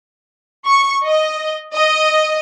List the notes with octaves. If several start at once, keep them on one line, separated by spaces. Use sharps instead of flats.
C#6
D#5
D#5